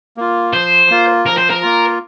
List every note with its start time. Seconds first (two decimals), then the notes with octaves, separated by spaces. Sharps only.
0.17 A#3 F4
0.53 F3 C5
0.90 A#3 F4
1.26 F3 A#4
1.37 C5
1.50 A#4
1.62 A#3 F4